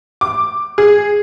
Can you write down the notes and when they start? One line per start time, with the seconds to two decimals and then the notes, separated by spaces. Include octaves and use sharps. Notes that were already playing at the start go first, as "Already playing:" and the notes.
0.21 D6
0.78 G#4